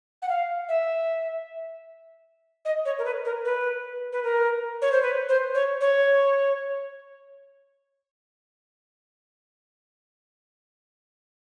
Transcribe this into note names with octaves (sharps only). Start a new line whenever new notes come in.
F#5
F5
E5
D#5
C#5
A#4
B4
A#4
B4
B4
A#4
C#5
C5
B4
C5
C#5
C#5